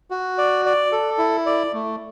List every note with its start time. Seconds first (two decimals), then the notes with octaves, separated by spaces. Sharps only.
0.11 F#4
0.38 D5
0.65 D5
0.92 A4
1.18 E4
1.46 D5
1.73 A3